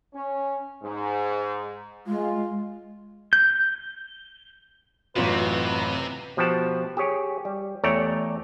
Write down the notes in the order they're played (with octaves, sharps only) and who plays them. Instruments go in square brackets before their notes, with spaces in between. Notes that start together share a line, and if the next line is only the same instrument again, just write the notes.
[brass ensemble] C#4
G#2
[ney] G#3 [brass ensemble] F4
[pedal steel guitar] G6
[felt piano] A1 F#2 F4 [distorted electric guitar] C3 [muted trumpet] B4
[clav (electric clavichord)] B2 F3 G4 F#5 A5
G4 G#4 C#5
G3
E2 A3 C#5 D5 G5 A#5